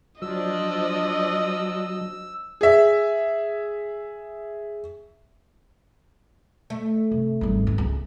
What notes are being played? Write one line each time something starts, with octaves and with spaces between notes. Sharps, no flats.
F3 F#3 D4 D5 D#5 E6
G#4 E5
A3
C3
G#1 G2
B3
C#2